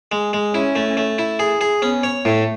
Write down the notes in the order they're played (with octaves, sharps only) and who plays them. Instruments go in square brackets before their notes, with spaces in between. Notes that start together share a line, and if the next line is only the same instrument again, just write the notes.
[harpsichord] G#3
G#3
[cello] C#4 [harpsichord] E4
[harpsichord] A3
A3
E4
G#4
G#4
[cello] B3 [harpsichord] C#4
[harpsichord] C#5
[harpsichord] A2 [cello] A3